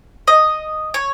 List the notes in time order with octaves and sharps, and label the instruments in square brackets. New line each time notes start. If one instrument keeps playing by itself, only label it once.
[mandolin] D#5
C#5